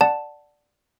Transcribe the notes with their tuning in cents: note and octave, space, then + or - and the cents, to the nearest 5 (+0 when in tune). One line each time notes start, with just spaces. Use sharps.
D5 +0 F#5 +0 A5 +0